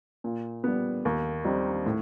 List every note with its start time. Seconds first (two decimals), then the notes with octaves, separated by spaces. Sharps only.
0.24 A#2
0.64 G3 B3
1.05 D#2
1.45 D#3 G3 C4 D#4
1.86 A2